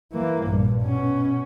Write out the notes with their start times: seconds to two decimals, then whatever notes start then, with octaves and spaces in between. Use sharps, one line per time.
0.12 E3 A#3
0.43 A#1 G2
0.82 B2 C#4